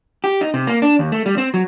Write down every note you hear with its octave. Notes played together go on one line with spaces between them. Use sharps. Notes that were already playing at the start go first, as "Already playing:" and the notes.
G4
D#4
C3
A#3
D4
D#2
A3
G3
C4
F#3